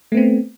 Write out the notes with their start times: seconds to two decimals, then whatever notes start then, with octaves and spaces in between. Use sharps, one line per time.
0.12 A3
0.14 B3
0.17 C4